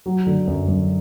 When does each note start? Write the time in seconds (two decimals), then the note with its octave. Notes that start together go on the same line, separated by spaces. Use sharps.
0.06 F#3
0.27 D3
0.47 F#2
0.68 F#2